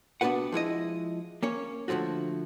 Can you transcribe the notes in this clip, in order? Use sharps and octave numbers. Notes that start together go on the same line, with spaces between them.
C2 B3 D4 F#4 B4 F#5
F3 G#3 E4 D#5
A#3 C#4 C#5
D3 E3 F3 A3 F#4